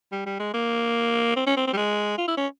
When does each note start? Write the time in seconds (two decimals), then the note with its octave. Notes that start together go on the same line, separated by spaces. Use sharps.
0.12 G3
0.26 G3
0.40 G#3
0.54 A#3
1.36 C4
1.46 C#4
1.57 C4
1.67 C4
1.73 G3
1.77 G#3
2.18 F4
2.28 E4
2.37 C#4